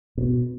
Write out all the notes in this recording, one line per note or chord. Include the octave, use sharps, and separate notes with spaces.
B2